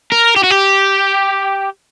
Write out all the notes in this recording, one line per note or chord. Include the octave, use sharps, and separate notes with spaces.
A#4
G4
F#4
G4